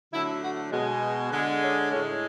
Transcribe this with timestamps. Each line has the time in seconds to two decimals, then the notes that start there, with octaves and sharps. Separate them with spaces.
0.12 D3 F#3 A3 E4
0.43 F#4
0.72 B2 G#3
1.31 D3 G#3
1.62 C#4
1.91 A2 G#3 C#4